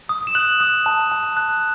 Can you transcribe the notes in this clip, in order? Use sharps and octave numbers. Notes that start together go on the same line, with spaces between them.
D#6
E7
F#6 F#7
D#6
A5
A5
F#6